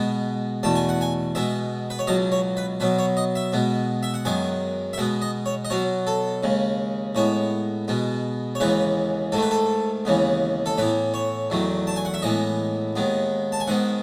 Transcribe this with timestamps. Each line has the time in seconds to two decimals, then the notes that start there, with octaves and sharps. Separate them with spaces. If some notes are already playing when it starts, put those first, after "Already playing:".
Already playing: B2 G#3 B3
0.63 E2 B2 A3 A5
0.75 G#5
0.89 F#5
1.01 G#5
1.35 B2 G#3 B3 E5
1.90 B4
1.99 C#5
2.07 C#2 B2 F#3 D#5
2.32 C#5
2.57 B4
2.80 B2 F#3 B3 B4
2.99 C#5
3.17 D#5
3.35 E5
3.53 B2 G#3 B3
4.03 E5
4.14 F#5
4.25 F#2 D#3 G#3 B3 G#5
4.93 E5
4.98 B2 G#3 B3 F#5
5.22 D#5
5.46 C#5
5.65 D#5
5.70 B2 F#3 B3 C#5
6.07 A4
6.43 D#2 C#3 G#3
7.15 A2 G#3 B3 C#5
7.88 B2 G#3 B3
8.55 C#5
8.60 D#2 C#3 E3 G#3 B3 B4
9.32 G#2 D#3 A3 A4
9.42 B4
9.51 A4
10.05 D#2 C#3 E3 G#3 B3
10.66 A4
10.78 A2 E3 B3 B4
11.14 C#5
11.50 E2 D#3 F#3 A3
11.87 A5
11.96 G#5
12.05 F#5
12.14 E5
12.22 A2 E3 G#3 B3 D#5
12.96 D#2 D#3 G#3 B3
13.52 A5
13.60 G#5
13.67 G#2 D#3 G#3 B3 F#5